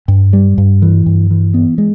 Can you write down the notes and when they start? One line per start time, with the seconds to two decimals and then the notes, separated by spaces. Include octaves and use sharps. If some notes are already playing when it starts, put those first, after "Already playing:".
0.08 G2
0.33 G3
0.58 G2
0.82 E3
1.06 G2
1.30 E3
1.54 B3
1.78 G#3